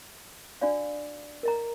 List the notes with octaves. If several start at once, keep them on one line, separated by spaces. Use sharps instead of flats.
D4 F#4 D5 F5
A#4 D#5 A#5